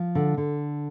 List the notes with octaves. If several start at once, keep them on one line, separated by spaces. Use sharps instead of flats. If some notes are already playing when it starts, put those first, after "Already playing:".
Already playing: F3
D3
D3